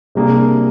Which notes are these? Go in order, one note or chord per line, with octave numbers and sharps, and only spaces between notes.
C3 G3 A#3 D4 G#4